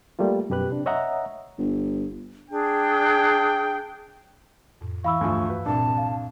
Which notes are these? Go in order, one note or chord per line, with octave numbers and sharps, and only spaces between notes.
G3 A3 A#3 F4
F#2 B2 G4 B4 F#6
C3 D4
C#5 D#5 E5 F#5 A#5
G1
D4 G#4 G5
F2 A2
E3 E4 F5 B5 C#6 E6
D2 G2 F3 G#5
F#4 B4
C2 A#2 D4 A5
F5